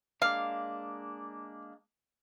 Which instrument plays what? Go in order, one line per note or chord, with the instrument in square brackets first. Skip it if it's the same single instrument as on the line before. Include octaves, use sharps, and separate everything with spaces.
[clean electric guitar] G#3 A#3 D4 [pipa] F5